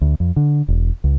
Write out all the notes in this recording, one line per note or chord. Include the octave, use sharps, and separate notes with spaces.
D2
F2
D3
E1
C#2